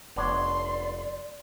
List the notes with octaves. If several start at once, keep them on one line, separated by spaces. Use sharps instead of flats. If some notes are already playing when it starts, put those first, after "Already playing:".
F1 B3 D4 C#5 D5 C6